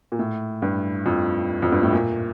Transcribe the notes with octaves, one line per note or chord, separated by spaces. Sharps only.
A#2
A2
G2
F2
F2
G2
A2
A#2